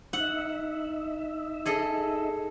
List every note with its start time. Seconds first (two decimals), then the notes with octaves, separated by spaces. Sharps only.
0.13 D#4 E5 F#5
1.66 G#4 A4 D#5